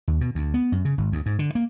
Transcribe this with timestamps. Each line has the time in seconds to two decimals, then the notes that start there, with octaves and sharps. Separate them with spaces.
0.08 D#2
0.21 B2
0.35 D2
0.54 B3
0.72 F#2
0.85 C#3
0.98 G#1
1.12 D2
1.26 G#2
1.39 D3
1.55 A#3